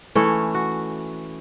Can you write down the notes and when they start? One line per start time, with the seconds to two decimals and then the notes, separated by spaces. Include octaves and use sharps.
0.15 E3 A3 C#4 C#5
0.54 F#4